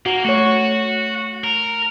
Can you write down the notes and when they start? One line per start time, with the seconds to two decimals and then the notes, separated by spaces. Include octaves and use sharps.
0.06 A#3 F#4
0.25 A3 F#4 C#5
1.44 A#4